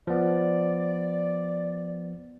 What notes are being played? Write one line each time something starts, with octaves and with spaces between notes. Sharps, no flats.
F3 B3 D5